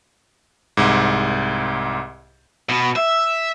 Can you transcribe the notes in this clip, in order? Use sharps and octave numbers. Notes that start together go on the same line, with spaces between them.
C2 G#2
B2 B3
E5